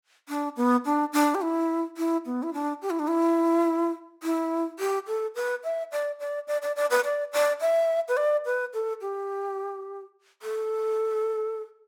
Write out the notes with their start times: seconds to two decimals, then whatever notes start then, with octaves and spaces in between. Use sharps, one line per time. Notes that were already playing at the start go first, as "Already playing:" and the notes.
0.29 D4
0.57 B3
0.85 D4
1.13 D4
1.35 G4
1.42 E4
1.97 E4
2.26 B3
2.43 E4
2.54 D4
2.82 G4
2.90 E4
2.99 D4
3.08 E4
4.23 E4
4.79 G4
5.07 A4
5.35 B4
5.64 E5
5.92 D5
6.20 D5
6.48 D5
6.62 D5
6.76 D5
6.91 B4
7.04 D5
7.33 D5
7.61 E5
8.08 B4
8.17 D5
8.46 B4
8.74 A4
9.01 G4
10.42 A4